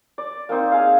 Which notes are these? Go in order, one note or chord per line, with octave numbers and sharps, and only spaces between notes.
D5
A#3 C4 D#4 C5
G#4 F5